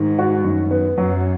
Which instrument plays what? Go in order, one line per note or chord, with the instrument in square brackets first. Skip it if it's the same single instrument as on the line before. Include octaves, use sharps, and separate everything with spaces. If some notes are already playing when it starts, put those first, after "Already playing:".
Already playing: [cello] G#2 [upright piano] D#3
[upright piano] F#4
[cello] F#2 [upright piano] D#3
[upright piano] B3
[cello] F#2 [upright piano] F#3